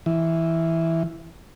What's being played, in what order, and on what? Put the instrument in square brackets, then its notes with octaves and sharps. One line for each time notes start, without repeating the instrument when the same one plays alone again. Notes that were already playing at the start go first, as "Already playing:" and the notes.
[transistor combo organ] E3